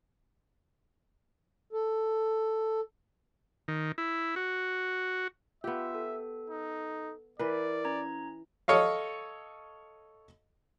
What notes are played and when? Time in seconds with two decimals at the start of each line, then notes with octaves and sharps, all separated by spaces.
1.73 A4
3.68 D#3
3.98 E4
4.36 F#4
5.64 B3 F4 G4 E5
5.95 A4
6.50 D#4
7.39 E3 A#4 B4 D5
7.85 C#4 A#5 G#6
8.68 A4 C#5 D#5 F5